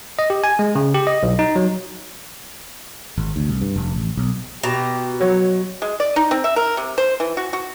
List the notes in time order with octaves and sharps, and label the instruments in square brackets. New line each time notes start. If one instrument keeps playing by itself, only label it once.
[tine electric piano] D#5
G4
G#5
G#3
C#3
G4
D#5
B1
D#4
F#3
[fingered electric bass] G#1
D2
C2
G2
F1
A1
B1
[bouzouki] B2 A#5 [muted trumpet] G4
[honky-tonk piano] F#3 [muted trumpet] C#5
[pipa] G#3
D5
D#4
C4
E5
A#4
C3
C5
E3
F#4
F#4